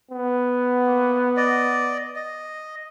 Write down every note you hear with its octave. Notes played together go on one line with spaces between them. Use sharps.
B3
A#3
D5 D#5
D#5